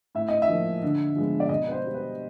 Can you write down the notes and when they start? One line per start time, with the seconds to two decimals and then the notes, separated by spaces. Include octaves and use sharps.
0.15 A2 E5
0.28 D#5
0.42 E5
0.49 F3 A#3
0.83 D3
1.16 F3 G#3 B3
1.40 D5
1.49 B2 D#5
1.67 B4
1.72 C5
1.84 G3 B3
1.94 B4